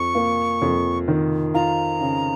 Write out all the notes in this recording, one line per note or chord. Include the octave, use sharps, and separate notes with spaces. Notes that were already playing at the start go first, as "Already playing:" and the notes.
Already playing: F2 C#6
A#3
F2
D#3
F4 A#5
C#3